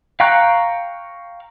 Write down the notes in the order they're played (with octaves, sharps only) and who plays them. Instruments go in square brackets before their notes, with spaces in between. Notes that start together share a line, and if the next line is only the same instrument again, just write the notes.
[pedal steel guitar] F5 G5 A#5 C#6 F#6